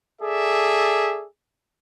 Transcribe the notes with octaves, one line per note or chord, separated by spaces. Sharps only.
G#4 A4 D5 E5